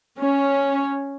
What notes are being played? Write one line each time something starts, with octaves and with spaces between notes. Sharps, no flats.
C#4